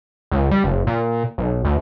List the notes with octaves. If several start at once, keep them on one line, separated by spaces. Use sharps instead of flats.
C#2
G3
F#1
A#2
B1
D2